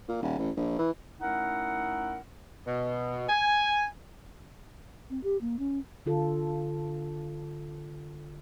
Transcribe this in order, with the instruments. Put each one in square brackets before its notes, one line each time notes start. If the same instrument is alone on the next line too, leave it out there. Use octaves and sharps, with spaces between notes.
[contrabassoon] A#2
D#1
A1
A#1
E3
[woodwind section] A3 C#4 D#4 E4 A#4 F#5
[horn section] B2
G#5
[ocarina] C4
G4
A#3
C#4
[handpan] D3 F4 A4